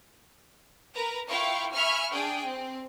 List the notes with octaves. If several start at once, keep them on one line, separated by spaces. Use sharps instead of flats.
A#4 B4 A#5
E4 F4 F5 G5 C#6
E5 G#5 B5 C#6 F6
D4 G#4 G5
C4